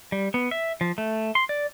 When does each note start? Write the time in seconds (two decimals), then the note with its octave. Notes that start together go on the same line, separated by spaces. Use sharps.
0.12 G3
0.34 B3
0.51 E5
0.81 F3
0.98 A3
1.35 C6
1.49 D5